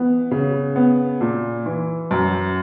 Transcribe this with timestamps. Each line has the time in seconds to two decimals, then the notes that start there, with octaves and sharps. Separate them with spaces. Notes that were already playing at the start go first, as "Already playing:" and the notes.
Already playing: E3 B3
0.31 C#3
0.76 B3
1.21 A#2
1.66 E3
2.11 F#2